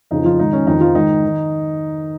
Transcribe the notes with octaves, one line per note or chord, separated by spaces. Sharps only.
F2 C#3 F3 D#4
F3 F4
G#2 D#3 D#4
C#4
F2 D#3 D#4
F3 F4
G#2 D#3 D#4
D#3